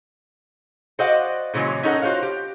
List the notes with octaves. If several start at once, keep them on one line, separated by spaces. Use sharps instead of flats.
F#4 C5 D5 D#5 F5 F#5
A#2 C#3 E3 F#3 G#3
C#4 D#4 A4 A#4 F#5
F4 F#4 C5 C#5 F5
G4